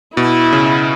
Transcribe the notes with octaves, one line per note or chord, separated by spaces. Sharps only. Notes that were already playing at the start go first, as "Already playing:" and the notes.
B2 E4
C#3